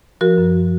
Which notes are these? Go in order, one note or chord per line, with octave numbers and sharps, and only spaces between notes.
F3 F#4 A#4
F#2